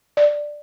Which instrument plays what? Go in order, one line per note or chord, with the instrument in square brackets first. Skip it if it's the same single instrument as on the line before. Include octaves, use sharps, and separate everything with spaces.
[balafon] D5